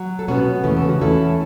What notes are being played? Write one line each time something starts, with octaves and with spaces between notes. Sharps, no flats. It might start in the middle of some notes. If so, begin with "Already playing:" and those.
Already playing: F#3
A4
B2 B3 C#4 F#4
E2 C#3 E3 A3 C#4 B4
A4
F#4
E2 E3 A3 C#4 E4 A4